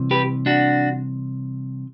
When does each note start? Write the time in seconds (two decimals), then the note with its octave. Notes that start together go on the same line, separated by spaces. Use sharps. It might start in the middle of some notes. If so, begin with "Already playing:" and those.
Already playing: C2 C3 E3
0.11 G4 B4
0.46 D4 F#4